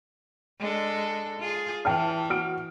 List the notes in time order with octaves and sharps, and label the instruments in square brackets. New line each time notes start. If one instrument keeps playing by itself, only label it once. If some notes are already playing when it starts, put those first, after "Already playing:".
[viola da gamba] G#3 D4 A4
F4 G#4
[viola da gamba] E3 [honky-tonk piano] G5 A5 F6
[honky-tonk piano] F#4 F6 D7